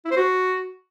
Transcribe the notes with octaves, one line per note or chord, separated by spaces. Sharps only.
E4
C5
F#4